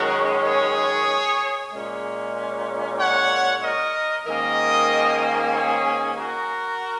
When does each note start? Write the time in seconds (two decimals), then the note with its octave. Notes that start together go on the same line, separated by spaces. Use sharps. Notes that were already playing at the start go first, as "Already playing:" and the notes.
Already playing: F#2 D#3 G#3 C#4 F#4 A#4
0.44 G#4 C#5
1.72 A#2 G#3 C#4
2.99 C#5 F#5
3.63 A#4 D#5
4.26 G#2 D#3 A#3 C#4 A#4 D#5
5.54 G#4 C#5
6.18 F#4 A#4